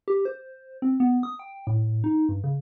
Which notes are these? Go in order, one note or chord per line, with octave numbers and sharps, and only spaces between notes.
G4
C5
C4
B3
D#6
G5
A2
D#4
G2
C#3